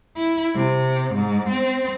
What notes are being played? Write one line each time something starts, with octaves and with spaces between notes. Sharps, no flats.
E4
C3
G#2
C4